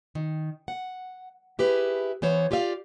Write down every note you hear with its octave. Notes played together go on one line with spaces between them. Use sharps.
D#3
F#5
E4 G4 G#4 B4
E3 B3 C5 C#5
F4 G4 D5 E5 F5